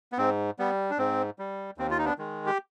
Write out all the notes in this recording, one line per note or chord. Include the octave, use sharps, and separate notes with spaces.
B3
G#2 C4
G3 B3
D4
G#2 C4
G3
D#2 C4
F4
D#4
B3 D4
D#3 G#3
G4